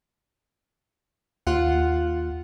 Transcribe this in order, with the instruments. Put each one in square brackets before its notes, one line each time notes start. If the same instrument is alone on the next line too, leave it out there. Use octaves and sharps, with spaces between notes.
[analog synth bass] D#2 [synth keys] F4 F#5